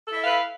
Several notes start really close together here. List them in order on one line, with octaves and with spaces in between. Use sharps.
A4 E4 E5 F5 B4